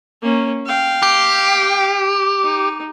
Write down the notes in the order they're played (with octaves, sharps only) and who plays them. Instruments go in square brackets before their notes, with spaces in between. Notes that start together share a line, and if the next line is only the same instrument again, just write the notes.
[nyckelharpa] A#3 C#4
F5 G5
[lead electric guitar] G4
[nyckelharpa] D#4